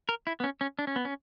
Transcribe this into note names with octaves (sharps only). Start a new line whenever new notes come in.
A#4
E4
B3
C#4
C#4
D4
C#4
B3
C#4